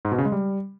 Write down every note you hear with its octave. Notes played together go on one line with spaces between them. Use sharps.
G#2
B2
C#3
G#3
G3